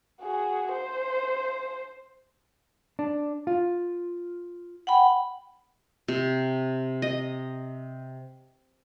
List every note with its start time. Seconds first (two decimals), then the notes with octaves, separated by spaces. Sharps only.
0.21 F#4 G#4
0.72 C5
2.99 D4
3.47 F4
4.87 F#5 G5 B5
6.08 C3
7.02 D#5